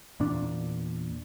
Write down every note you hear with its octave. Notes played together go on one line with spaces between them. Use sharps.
E2 A#2 D4